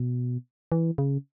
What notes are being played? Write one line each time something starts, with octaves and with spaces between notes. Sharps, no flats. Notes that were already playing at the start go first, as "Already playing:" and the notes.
Already playing: B2
E3
C#3